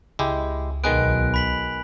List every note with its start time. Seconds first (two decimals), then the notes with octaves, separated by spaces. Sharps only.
0.19 C#2 G#3 E4 G4
0.84 B1 D#3 G#3 B3 G#5 F#6 D7
1.34 B5 B6 F#7